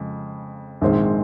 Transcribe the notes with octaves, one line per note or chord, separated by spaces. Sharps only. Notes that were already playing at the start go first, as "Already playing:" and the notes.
Already playing: F2 C#3 G#3
A#1 G#2 D#3 G#3 C4